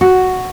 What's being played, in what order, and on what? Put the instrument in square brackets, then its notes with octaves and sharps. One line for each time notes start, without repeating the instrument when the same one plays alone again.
[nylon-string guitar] F#4